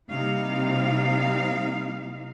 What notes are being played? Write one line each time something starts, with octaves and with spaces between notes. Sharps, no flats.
C3 G3 A#3 D#4 E4 F5